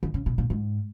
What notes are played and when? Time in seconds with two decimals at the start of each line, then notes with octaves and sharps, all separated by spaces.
0.03 D#3
0.14 C#3
0.26 B2
0.38 A#2
0.50 G#2